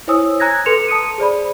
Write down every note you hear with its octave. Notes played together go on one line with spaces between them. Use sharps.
E4 C5 C#5 G#5 D#6 E6
G#5 A#5 F#6 G#6 A#6
A4 B4 C6 C#7 E7 F7
A5 D#6 C#7 D#7
G#4 C5 D5 B5